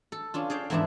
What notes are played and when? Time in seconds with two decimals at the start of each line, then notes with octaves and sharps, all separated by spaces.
0.12 A4
0.34 C#4 D4 F4
0.50 G#4 D5 F5 G5
0.70 E2 G#2 E3 F3 D4 E4